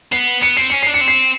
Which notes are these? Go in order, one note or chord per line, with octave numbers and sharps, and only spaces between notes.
B3 C7
B3 C#7
C4 C7
C#4 C#7
D4 C7
C#7
C4
C7